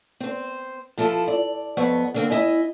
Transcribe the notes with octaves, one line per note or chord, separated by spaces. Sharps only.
C4 C5
F3 E4 F4 A4
D5
F2 B3 C#5
D3 A#3 C4
E4 D#5 G#5